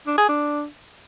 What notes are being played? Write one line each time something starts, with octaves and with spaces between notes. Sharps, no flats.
D4
G#4
D4